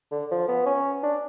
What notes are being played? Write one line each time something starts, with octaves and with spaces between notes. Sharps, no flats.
D3
F3
B3
C#4
D4